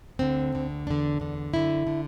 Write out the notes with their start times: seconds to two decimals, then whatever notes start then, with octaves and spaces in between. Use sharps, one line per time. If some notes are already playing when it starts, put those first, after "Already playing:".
0.19 D2 D3 C4
0.52 D2 D3
0.87 E2 D3 D4
1.20 E2 D3
1.53 F#2 D3 E4
1.87 D3